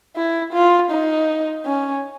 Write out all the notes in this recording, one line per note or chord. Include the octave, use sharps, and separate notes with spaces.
E4
F4
D#4
C#4